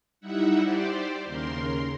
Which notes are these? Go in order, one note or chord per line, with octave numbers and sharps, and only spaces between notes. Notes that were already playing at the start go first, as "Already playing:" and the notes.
G3 D#4 E4 E5 F#5
G4 C5 D5
D#2 C#3 A#4 C6